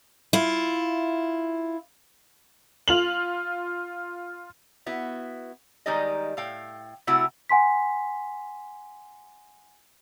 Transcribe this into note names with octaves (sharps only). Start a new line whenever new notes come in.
E4 F4
F4 F7 F#7
B3 E4 F#4
D#3 G3 G#3 D#4 D5 D#5
A2 F5 G5
C3 A3 E4 F#4
F#5 G#5 C6 B6